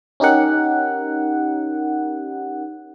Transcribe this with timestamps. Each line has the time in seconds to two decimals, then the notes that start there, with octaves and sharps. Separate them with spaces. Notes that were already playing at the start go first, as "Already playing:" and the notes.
0.20 C#4 D#4 G4 A#4 F#5